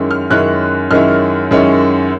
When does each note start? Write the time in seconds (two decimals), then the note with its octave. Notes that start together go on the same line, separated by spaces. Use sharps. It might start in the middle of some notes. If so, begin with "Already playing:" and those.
Already playing: F#2 D#3 G#3 C#4 E4
0.11 F6
0.30 F#2 D#3 G#3 C#4 E4 F#6
0.91 F#2 D#3 G#3 C#4 E4 F6
1.51 F#2 D#3 G#3 C#4 E4